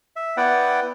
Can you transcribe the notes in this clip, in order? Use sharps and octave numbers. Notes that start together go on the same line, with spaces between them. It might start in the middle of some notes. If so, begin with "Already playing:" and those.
E5
B3 E4 B4 D5 F#5 G5